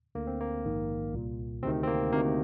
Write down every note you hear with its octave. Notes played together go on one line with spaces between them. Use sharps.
D2 D3 A#3
C4
A#3
A#1 G#2 D#3
C2 A#2
D2 C3 D#3 C4
C4
A#3
D2 C3 D#3 A#3